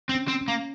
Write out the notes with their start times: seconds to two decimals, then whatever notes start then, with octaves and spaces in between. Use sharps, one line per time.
0.09 C4
0.15 C#4
0.28 C4
0.41 C#4
0.48 A#3